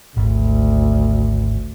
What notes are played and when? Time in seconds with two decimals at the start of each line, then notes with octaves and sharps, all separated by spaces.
0.17 G#1 D2